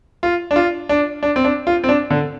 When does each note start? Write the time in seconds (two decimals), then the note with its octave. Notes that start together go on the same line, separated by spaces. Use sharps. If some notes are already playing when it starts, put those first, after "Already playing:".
0.23 F4
0.51 D4
0.56 F4
0.89 D4
1.23 D4
1.36 C4
1.44 D4
1.67 F4
1.84 C4
1.89 D4
2.10 D3